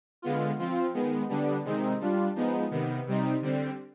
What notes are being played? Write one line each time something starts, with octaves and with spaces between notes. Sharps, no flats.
D3 G#3 B3 F4
F3 C4 F4
D#3 G#3 B3
D3 G3 B3 D4
C3 D#3 G#3 C4 D#4
G3 D4 F4
F3 G#3 B3 D#4
C3 D#3 B3
C3 G3 C4 D#4
D3 G3 C4